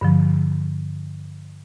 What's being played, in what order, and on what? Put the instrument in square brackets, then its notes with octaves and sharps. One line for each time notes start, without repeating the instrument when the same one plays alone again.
[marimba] G2 D3 F3